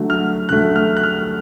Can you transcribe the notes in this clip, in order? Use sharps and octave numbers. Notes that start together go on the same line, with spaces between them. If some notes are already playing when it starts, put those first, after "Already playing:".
Already playing: D3 F#3 A3
F6
D3 F#3 A3 F#6
F6
F#6
F6